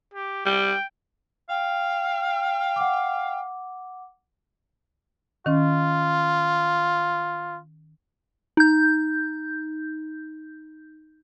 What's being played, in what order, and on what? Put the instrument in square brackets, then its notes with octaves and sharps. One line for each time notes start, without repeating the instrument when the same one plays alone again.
[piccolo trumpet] G4
[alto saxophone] G3 [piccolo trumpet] G5
[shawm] F5 [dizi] G5
[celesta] F#5 D6
[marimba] D#3 C#4 [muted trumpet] F4
[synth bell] D#4 G6